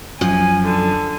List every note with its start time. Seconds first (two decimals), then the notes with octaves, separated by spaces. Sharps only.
0.21 F#2 F3 G#5
0.63 D3